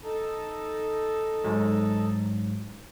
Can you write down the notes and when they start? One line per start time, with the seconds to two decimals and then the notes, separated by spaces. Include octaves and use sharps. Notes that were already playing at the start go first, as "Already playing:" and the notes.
0.04 D#4 A4
1.44 G#2 F#3